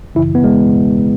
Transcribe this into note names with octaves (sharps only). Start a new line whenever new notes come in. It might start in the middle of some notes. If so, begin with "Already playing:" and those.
F#2 C#3 E3 E4
B3
G#3